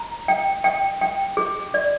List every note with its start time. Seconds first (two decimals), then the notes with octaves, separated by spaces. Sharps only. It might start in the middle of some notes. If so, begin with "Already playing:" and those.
Already playing: A#5
0.28 G5
0.64 G5
1.01 G5
1.37 G#4
1.74 D5